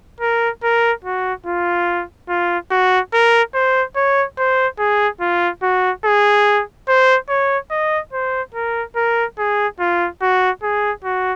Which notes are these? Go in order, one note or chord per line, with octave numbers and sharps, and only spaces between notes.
A#4
A#4
F#4
F4
F4
F#4
A#4
C5
C#5
C5
G#4
F4
F#4
G#4
C5
C#5
D#5
C5
A#4
A#4
G#4
F4
F#4
G#4
F#4